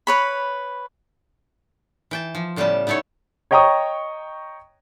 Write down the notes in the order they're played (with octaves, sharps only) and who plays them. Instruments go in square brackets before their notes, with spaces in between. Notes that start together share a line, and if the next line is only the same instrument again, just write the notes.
[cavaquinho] B4 C#5 B5
[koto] E3 G5 A5
F3
A2 C#3 G3 B3 G5 A5
B3 D#4 E4 A4 C#5
[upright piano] C#5 D#5 G5 A#5 C#6 D#6